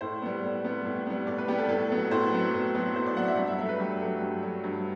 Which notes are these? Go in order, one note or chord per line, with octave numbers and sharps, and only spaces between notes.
A2 C5
G3 B3
A2
G3 B3
A2
G3 B3
A2 D5
B4
G3 B3 G4
A4
A2 A4
F#3 B3
A2 C5
F#3 B3
A2
F#3 B3
A2 C5
D5
F#3 B3 F#5
E5
G2 F#5
E5
F#3 A3 E5
B4
G2 G4
F#3 A3
G2 G4
F#3 A3
G2